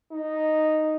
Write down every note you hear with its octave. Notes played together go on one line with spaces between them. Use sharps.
D#4